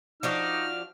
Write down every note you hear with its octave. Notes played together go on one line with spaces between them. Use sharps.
F3 D4 D#4 F#4 F6